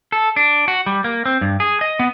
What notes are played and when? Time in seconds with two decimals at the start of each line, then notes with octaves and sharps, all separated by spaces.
0.12 A4
0.36 D4
0.68 F#4
0.86 G3
1.04 A#3
1.26 C4
1.41 G2
1.60 G#4
1.81 D#5
1.99 B3